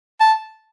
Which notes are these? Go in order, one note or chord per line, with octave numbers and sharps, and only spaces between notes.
A5